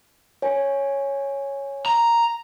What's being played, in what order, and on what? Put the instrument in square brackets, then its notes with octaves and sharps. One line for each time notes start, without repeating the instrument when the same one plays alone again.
[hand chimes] C#5 G#5
[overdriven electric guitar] A#5